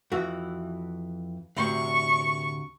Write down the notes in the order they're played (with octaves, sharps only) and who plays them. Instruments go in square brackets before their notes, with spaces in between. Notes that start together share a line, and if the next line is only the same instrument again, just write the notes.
[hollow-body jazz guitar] F2 E3 F#4
[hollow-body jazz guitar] D2 A2 C3 [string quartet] C#6